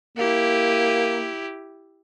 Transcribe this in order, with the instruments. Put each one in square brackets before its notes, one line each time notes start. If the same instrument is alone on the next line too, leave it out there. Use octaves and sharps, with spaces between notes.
[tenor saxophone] A#3 [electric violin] E4 G4